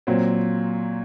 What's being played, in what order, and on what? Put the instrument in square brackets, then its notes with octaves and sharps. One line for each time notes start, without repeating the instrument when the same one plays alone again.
[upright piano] A#2 F#3 C4